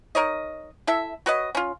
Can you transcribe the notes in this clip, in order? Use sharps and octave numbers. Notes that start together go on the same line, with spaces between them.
D#4 A#4 C#5 D#5
E4 A4 E5
F#4 B4 C#5 D#5
C#4 F4